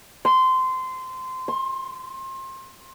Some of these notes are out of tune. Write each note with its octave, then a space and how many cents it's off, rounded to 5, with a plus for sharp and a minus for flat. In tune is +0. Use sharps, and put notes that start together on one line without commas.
C6 -20
C6 +30